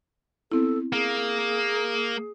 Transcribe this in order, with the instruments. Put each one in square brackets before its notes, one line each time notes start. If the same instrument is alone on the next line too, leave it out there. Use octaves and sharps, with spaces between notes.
[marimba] B3 C4 E4 [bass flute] A4
[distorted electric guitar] A#3 [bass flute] G#4